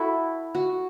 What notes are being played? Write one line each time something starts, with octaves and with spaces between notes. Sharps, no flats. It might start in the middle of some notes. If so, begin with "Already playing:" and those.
Already playing: E4 F#4 A4
F#4